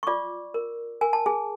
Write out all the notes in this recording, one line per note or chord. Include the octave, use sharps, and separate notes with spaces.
C#6
F4 D5 D6
A#4
A#4 G#5
A5
G#4 G#5